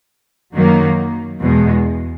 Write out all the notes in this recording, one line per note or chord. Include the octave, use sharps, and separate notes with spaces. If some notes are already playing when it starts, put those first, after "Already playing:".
F#2 D#3 F#3 A#3
E2 B2 G#3